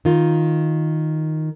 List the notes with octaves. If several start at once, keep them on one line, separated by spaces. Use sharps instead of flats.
D#3 F4